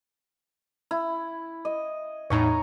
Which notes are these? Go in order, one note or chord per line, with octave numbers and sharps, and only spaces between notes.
E4
D#5
E2 A2 D#4 C#5 G#5 A#5